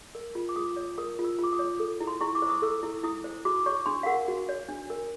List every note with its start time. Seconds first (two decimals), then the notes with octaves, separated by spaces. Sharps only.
0.15 A#4
0.35 F4
0.49 D6
0.56 F4 D#6
0.76 C#5
0.98 A#4 D#6
1.19 F4
1.25 E6
1.39 F4 D6
1.53 D#6
1.59 C#5
1.80 A4
2.01 E4
2.07 C6
2.21 E4 C#6
2.35 D6
2.42 C5
2.49 D#6
2.62 A4 E6
2.83 E4
3.04 E4 D#6
3.24 C5
3.45 F#4 D6
3.66 C#5 C#6
3.86 D4 C6
4.03 F5
4.06 A#4 F#5
4.28 F#4
4.49 C#5
4.69 D4
4.90 A#4